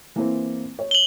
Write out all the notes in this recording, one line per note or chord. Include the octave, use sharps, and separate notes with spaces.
E3 A#3 C4
C#5
F#7 G7